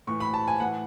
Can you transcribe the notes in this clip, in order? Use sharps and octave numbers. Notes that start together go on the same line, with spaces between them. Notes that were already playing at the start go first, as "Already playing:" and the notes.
A2 E3 C#6
B5
A5
G#5
A2 E3 F#5